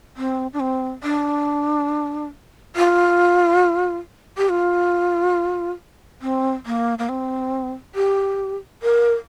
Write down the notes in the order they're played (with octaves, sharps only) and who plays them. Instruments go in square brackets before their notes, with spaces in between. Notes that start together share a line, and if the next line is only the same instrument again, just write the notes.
[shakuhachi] C4
D4
C4
D4
F4
G4
F4
C4
A#3
A#3
C4
G4
A#4